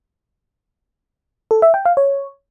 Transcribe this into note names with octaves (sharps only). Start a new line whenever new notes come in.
A4
E5
G5
F5
C#5